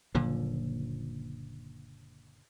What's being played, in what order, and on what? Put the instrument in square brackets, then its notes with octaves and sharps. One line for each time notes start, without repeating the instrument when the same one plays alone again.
[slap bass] F#1 A#2 D3 F3